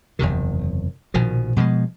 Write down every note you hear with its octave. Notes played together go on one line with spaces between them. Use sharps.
F#1 E2 C3 D#3
A#1 B2 D#3 F3
B2 F3 F#3 G#3